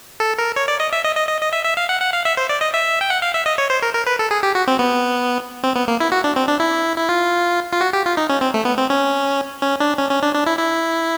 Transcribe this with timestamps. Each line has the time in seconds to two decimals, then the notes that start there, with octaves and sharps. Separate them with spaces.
0.20 A4
0.38 A#4
0.56 C#5
0.68 D5
0.80 D#5
0.93 E5
1.04 D#5
1.16 D#5
1.29 D#5
1.41 D#5
1.53 E5
1.65 E5
1.77 F5
1.89 F#5
2.01 F#5
2.13 F5
2.25 E5
2.37 C5
2.49 D5
2.61 D#5
2.74 E5
3.01 G5
3.10 F#5
3.22 F5
3.34 E5
3.46 D#5
3.58 C#5
3.70 C5
3.82 A#4
3.94 A#4
4.07 B4
4.19 A4
4.31 G#4
4.43 G4
4.55 F#4
4.68 C4
4.79 B3
5.64 C4
5.76 B3
5.88 A#3
6.00 E4
6.12 F#4
6.24 D4
6.36 C4
6.48 D4
6.60 E4
6.98 E4
7.09 F4
7.73 F4
7.81 F#4
7.93 G4
8.06 F4
8.17 D#4
8.29 C#4
8.41 C4
8.54 A3
8.65 B3
8.78 C4
8.90 C#4
9.62 C#4
9.80 D4
9.98 C#4
10.11 C#4
10.23 D4
10.35 D4
10.46 E4
10.59 E4